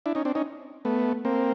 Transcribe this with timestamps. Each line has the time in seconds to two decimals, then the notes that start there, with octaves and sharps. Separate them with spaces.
0.06 D4 E4
0.15 C#4 D#4
0.25 C4 D4
0.35 C#4 D#4
0.85 A3 B3
1.25 A#3 C4